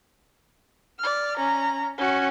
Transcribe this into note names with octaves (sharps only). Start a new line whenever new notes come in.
D5 F6
C#4 A#5
C#4 F#4